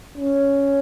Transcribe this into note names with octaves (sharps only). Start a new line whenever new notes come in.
C#4